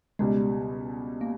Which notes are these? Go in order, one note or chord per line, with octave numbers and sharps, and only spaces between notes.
C#2 B2 G3 G#3
A#3